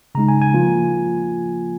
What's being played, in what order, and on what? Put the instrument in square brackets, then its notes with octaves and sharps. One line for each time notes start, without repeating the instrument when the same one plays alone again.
[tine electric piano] C#3 G#3 D#4 A#5
G#5
G#5
F3 A#3 F4